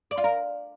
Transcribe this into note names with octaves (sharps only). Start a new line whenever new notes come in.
D5
F4
A#4